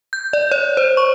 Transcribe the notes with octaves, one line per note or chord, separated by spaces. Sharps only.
G6
D5
C#5
C5
C#6